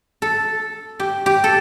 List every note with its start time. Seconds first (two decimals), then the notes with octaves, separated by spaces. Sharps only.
0.22 A4
1.00 G4
1.26 G4
1.44 A4